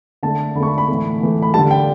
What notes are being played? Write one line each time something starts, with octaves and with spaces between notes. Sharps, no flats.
D3 A3 A5
D3 A3 B5 C#6
B5
B5
A2 E3 A3
A2 E3 A3
B5
D3 G3 A5
G5